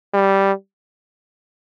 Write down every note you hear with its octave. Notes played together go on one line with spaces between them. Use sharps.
G3